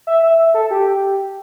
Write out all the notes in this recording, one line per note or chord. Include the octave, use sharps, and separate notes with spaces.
E5
E5
E5
A4
G4